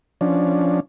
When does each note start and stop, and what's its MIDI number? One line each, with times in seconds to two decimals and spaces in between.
0.21 0.80 53
0.21 0.80 61
0.21 0.80 62